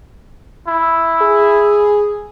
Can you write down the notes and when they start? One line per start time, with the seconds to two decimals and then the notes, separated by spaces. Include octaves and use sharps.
0.68 E4
1.22 G#4